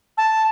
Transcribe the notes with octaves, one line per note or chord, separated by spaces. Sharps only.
A5